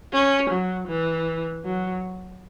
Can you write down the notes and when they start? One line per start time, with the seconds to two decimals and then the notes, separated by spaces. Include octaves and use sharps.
0.13 C#4
0.50 F#3
0.88 E3
1.64 F#3